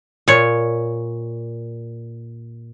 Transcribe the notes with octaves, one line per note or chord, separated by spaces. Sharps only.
A#2 C#5